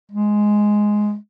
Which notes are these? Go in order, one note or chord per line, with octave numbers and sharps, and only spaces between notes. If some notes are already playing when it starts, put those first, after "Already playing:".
G#3